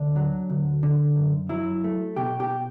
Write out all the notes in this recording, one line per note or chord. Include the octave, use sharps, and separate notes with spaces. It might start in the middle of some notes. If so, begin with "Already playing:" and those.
Already playing: D2 D4
F#3
D2
D3
F#2
F#3 E4
A3
B2 G4
G4